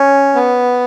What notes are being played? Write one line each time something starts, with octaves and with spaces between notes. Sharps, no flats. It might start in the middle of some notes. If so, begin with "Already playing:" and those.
Already playing: C#4
B3